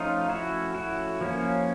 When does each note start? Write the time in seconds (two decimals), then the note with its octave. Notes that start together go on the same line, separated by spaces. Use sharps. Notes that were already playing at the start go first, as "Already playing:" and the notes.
Already playing: F3 A3 C#4 D#4 F4
0.29 E4 F#4
0.75 E4 F#4
1.21 F3 A#3 C#4